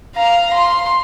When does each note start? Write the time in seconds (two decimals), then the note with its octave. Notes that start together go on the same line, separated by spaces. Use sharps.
0.16 F5 A#5
0.54 C6